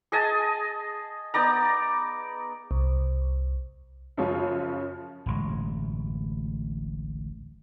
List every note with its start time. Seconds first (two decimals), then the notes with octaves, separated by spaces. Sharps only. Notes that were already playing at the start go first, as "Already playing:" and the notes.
0.12 G#4 D#5 G#5 A5
1.34 B3 D#4 D5 A#5
2.71 C2
4.17 F#2 C#3 F3 C#4 F4
5.26 D1 A1 G#3